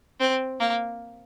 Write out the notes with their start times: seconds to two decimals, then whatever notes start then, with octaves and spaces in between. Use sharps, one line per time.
0.20 C4
0.60 A#3